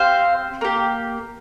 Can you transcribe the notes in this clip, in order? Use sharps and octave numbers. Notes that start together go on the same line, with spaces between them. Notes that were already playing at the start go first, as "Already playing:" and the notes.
Already playing: C4 G4 C5 F5
A#3 G4